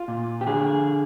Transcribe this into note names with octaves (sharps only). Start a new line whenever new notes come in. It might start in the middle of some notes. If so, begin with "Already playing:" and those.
Already playing: F4
A#2
G4
D3 G#4